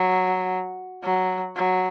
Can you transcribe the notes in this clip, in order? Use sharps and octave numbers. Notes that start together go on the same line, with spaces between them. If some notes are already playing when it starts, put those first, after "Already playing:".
Already playing: F#3
F#3
F#3